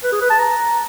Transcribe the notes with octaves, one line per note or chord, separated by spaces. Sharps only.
B4
G#4
B4
A5
A#5